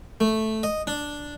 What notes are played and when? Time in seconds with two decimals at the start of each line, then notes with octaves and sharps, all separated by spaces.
0.20 A3
0.63 D#5
0.87 D4